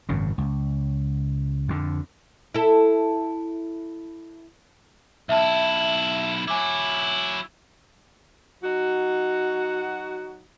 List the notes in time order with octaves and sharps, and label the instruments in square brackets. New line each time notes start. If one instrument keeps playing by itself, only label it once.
[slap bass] G#1 F#2 C#3
C#2
F2 D3
[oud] E4 A4
[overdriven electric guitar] B1 E4 [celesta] E5 A5
[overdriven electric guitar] F#3 E4 [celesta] G#5 D6
[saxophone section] F#3 D#4 F#4